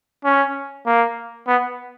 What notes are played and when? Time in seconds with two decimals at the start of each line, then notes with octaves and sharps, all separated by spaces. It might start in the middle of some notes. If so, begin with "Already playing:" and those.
0.25 C#4
0.86 A#3
1.47 B3